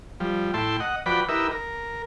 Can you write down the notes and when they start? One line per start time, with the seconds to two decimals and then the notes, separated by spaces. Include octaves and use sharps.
0.20 F3 G3
0.54 A2 E4 G5 A5 C6
0.80 D#5 F#5
1.06 F3 F#4 B4 D5 G5 B5
1.29 D#4 E4 G4 A#4 B4 E5
1.52 A#4